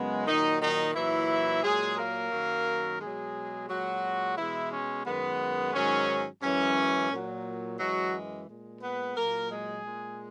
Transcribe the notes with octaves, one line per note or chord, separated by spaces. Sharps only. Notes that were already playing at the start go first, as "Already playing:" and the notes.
Already playing: F#2 C#3 G#3 B3
A#2 D#3 F#3 D#4
D#3 D#4
A#2 E3 F#3 E4
A#2 F#3 G#3 G#4
A#3 A#4
F#2 D#3 F#3
B2 F#3 G#3 G#4
A#2 F#3 G#3 F#4
B2 E3 G#3 E4
C#4
F#2 D#3 G#3 B3
G#2 D#3 F#3 C#4
F#2 E3 G#3 C#4
A#2 F#3
F#2 E3 F#3 G#3 F#4
A#2 G#3
B3 B4
A#2 F#3 A#3 A#4
G#3 G#4
A#2 G#3